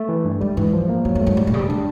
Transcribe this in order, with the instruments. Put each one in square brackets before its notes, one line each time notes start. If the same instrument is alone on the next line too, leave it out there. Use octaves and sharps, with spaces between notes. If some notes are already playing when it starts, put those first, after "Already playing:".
Already playing: [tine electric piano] A3
E3
G2
[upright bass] G#2 [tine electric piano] G3
[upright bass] G#2 [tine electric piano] E3
[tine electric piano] F3
A#3
[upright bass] A2 [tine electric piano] F#3
[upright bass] G#2
[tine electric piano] A3
[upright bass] G#2
[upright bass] A2 [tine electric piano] G3
[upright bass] A#2
[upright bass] C#3 [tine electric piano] G3
[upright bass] C3
[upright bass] D3 [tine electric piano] D4